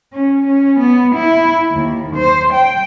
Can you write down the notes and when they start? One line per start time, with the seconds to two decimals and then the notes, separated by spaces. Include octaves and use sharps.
0.13 C#4
0.47 C#4
0.79 B3
1.15 E4
1.72 D#2
2.16 C5
2.53 G5